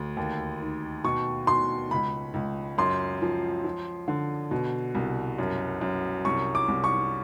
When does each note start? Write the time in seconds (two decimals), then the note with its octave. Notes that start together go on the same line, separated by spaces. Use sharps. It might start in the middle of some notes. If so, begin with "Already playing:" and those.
Already playing: D2
0.17 D#2
0.60 D#3
1.04 B2 C#6
1.47 B2 C6
1.91 C#2 B5
2.34 C#2
2.78 F#2 C6
3.22 F3
3.64 F3
4.08 D3
4.51 B2
4.95 C2
5.38 F#2
5.81 F#2
6.25 C2 C#6
6.55 D6
6.68 C2
6.84 C#6